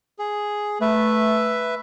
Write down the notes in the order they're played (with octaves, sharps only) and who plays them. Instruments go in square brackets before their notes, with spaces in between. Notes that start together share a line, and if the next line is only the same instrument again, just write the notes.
[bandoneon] G#4
[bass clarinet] A3 [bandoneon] B4 E5